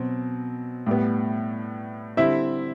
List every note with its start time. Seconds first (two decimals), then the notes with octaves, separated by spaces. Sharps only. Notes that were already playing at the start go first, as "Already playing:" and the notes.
Already playing: B2 F#3 C4
0.87 A2 G3 B3
2.17 D3 G3 C4 E4 E5